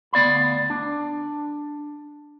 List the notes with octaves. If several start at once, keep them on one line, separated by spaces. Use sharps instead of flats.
D2 B3 D5 F5 B5
D4